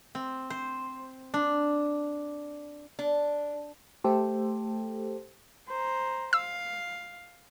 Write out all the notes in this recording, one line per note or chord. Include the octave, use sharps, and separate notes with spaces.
C4
C5
D4
D4
A3 G4 A4 C5
C5 A#5
F5 E6